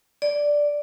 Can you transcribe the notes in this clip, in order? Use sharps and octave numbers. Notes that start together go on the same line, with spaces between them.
D5